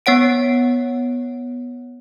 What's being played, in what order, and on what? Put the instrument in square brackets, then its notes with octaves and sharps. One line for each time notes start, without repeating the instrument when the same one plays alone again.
[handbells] B3 C#5 F#5 D7